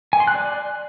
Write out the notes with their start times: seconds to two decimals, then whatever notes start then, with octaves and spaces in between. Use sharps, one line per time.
0.13 G#5
0.20 C6
0.28 F#6
0.35 D5